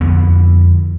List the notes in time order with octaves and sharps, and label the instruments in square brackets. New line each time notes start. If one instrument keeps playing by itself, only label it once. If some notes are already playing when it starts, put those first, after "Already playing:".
[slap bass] F2 D3 B3